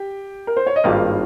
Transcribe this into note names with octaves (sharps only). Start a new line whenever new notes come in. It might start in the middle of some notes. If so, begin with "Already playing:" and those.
Already playing: G4 G5
A#4
C5
C#5
D#5
G#1 G2 D#3 G3 A#3 F4 F5